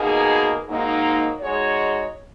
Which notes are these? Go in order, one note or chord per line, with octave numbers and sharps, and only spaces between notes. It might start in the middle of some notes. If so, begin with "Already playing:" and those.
Already playing: B2 A#3 D#4 G#4
G#2 F#3 A#3 D#4
G#3 D#4 F#4 C#5